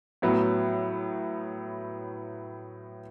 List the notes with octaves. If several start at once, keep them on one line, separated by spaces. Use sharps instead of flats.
A2 F#3 B3